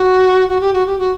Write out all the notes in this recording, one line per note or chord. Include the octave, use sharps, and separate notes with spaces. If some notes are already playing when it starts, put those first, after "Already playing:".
Already playing: F#4
F#4
G4
F#4
G4
F#4